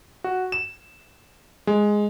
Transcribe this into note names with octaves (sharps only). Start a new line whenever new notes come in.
F#4
E7
G#3